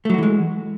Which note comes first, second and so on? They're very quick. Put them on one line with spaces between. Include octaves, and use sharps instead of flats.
A3 F#3 F#4 E3 G#3